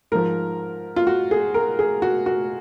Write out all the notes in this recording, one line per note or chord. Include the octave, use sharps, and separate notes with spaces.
G#2 F3 A#4
F4
F#4
G#4
A#4
G#4
F#4
F#4